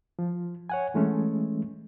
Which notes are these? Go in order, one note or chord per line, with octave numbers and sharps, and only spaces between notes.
F3
C#5 F#5 G#5
E3 G#3 A3 C#4